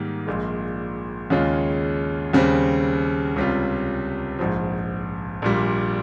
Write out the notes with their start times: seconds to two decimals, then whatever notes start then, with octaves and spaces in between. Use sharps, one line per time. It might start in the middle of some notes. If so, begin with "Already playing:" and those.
Already playing: G#2 D#3 G3 A#3
0.27 A#1 A#2 G#3
1.30 D#2 C#3 G#3 C#4 F4
2.33 D#2 C#3 G3 C4
3.36 C#2 C3 G3 C#4 F4
4.39 A#1 G#2 F3
5.42 A#1 A#2 G3